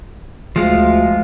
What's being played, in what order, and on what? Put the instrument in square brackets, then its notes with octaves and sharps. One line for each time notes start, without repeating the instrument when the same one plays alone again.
[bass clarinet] D2 [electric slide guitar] F3 G#3 F4